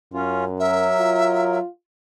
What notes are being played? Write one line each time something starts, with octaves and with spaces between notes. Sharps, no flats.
F#2 C#4 F4
F#3 A#4 E5
F4